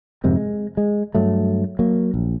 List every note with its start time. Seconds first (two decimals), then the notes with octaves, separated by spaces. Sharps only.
0.24 F2 G#2 C3 D#3
0.36 G#3
0.77 G#3
1.15 G2 F#3 A3
1.79 F#3 A#3
2.14 A#1